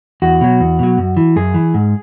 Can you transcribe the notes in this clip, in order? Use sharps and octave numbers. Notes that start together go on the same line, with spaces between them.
E2 F#4
B2 F#3
E2
B2 F#3
F#2
E3
F#2 G#4
E3
G#2